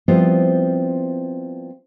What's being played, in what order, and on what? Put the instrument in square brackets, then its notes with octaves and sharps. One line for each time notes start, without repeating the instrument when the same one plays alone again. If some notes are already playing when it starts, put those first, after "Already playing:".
[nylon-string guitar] F3 G3 B3 C4 E4 F4